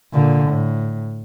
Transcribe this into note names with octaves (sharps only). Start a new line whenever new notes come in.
A#2 D3
A2